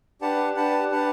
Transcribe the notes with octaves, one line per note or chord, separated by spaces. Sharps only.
D4 G4 B4 F#5 A5
D4 G4 B4 F#5 A5
D4 G4 B4 F#5 A5